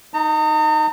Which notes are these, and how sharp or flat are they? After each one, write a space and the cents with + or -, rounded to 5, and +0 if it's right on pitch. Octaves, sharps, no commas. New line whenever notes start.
D#4 +0 A#5 -40